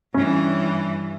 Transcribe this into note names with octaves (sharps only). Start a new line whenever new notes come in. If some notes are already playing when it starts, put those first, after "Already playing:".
G2 E3 C#4